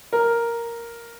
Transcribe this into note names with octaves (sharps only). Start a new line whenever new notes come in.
A#4